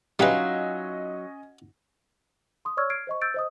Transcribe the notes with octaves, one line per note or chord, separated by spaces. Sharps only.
F#3 G3 C#4 D#4 F4 B4 D#5 E5
C6 D#6
C#5 D5 C#6 E6 F6 G#6
F6 G#6 C7 D7
C5 D#5 C#6
E6 G6 A6 D7
C5 D#5 D#6